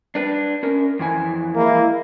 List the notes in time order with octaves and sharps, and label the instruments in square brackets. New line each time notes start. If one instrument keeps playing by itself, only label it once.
[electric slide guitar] D4 B4
C#4 A#4
F2 E3 G#5
[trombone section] G#3 A#3 E4